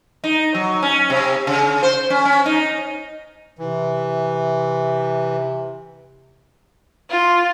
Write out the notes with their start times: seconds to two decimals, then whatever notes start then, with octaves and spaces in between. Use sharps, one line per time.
0.24 D#4
0.54 F#3
0.82 C#4
1.10 C3
1.47 C#3
1.83 C5
2.10 C#4
2.25 C#4
2.46 D#4
3.59 C3 E3
7.10 F4